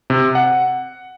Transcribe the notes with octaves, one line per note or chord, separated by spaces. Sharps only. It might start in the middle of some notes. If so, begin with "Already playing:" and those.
C3
F#5